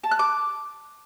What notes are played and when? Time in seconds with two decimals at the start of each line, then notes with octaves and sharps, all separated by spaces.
0.04 A5
0.11 F#6
0.19 D6